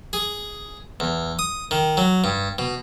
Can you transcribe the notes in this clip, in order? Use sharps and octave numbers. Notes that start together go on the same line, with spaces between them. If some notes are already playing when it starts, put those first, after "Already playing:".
G#4
E2
D#6
D#3
F#3
G2
B2